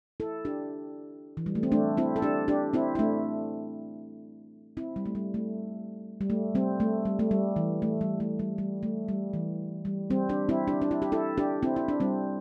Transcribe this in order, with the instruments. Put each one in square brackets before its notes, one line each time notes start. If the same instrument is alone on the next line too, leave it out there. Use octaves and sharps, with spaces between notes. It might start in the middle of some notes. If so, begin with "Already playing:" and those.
[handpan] E4 A4
D4 G4
E3
G3
A3
C4
A3 D4
C4 E4
A4
D4 G4
D4 G4
C4 E4
E4
A3 D4
C4 E4
G3
A3
G3
A3
G3
A3
G3 C4
A3
G3
A3
G3
E3
A3
G3
A3
G3
G3
A3
G3
E3
G3
G3 C4
D4 G4
C4 E4
D4 G4
D4
E4
G4
E4 A4
D4 G4
C4 E4
E4
D4
G3 C4